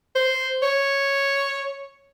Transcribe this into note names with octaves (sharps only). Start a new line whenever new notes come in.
C5
C#5